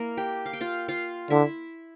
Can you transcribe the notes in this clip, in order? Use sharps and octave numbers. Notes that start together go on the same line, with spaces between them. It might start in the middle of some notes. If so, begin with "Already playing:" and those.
Already playing: A#3 E4 A#4
G4 G5
F5
G5
F4 F5
F4 F5
D3 E4 E5